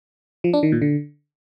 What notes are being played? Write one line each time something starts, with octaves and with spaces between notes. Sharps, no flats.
F3
D4
D#3
A#2
D3